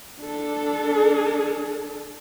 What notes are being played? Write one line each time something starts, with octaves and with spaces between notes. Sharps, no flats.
D4 A4